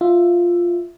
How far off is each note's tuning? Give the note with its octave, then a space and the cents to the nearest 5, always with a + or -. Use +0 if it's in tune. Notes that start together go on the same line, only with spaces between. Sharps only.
F4 +0 E5 +10